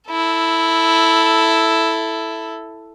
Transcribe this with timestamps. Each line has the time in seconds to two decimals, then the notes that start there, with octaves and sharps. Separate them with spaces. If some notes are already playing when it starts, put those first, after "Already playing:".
0.10 E4 A4